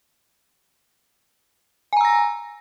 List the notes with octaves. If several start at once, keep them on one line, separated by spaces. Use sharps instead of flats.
G#5 A#5 E6 A#6